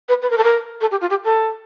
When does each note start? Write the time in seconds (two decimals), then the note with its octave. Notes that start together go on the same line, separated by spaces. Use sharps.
0.09 B4
0.22 B4
0.30 A#4
0.38 A4
0.44 A#4
0.81 A4
0.91 G4
1.01 F4
1.10 G4
1.24 A4